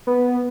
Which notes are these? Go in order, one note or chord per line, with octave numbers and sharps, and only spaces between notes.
B3